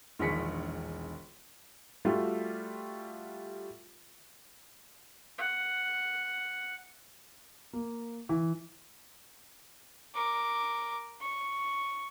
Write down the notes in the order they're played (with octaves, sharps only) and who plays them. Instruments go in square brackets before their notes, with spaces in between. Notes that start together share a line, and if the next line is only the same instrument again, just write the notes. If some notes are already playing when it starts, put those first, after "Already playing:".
[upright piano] E1 A#1 D#3 G#4 B6 C#7
[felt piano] G3 A3 F4 F#4
[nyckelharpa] F#5
[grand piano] A#3
E3
[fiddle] A#4 D6
C#6